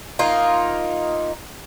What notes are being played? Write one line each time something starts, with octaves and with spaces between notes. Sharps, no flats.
A#3 D#4 F4